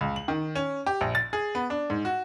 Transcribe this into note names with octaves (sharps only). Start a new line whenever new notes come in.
C#2
F#7
D#3
C#4
G4
A#1
A6
G#4
B3
D4
G#2
F#4